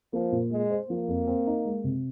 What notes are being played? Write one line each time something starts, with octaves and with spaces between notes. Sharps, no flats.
F3 A#3
A#2
G#3 G#4
C5
F3 A#3
F2
C4
D#4
G#3
C3